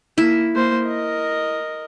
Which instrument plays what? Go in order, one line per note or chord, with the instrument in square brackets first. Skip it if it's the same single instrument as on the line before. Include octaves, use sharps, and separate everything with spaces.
[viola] A#3 [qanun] E4
[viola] A#3 C5
A#4 D#5